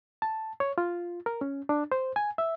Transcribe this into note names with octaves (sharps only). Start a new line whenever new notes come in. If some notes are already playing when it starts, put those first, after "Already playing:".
A5
C#5
F4
A#4
C#4
D4
C5
G#5
E5